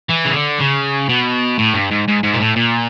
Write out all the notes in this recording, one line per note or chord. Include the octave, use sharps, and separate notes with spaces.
E3
C#3
D3
C#3
B2
A2
G2
G#2
G#2
G#2
A#2
A2
A#2